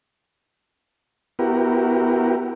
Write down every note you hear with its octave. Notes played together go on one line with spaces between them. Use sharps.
B3 E4 F#4 G4 A#4